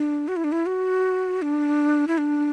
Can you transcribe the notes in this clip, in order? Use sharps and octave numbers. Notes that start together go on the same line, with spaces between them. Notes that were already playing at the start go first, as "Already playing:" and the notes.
Already playing: D4
F#4
E4
D4
E4
F#4
D4
E4
D4